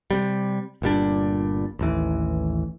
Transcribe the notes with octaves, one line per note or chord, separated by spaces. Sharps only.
C3 G3
G1 A#2 G3 D4
A1 D#2 E3